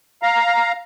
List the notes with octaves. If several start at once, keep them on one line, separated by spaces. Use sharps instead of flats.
F5 A#5